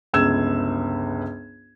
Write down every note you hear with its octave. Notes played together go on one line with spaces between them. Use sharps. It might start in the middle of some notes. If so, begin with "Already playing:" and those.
G1 C#2 E6 G#6 E7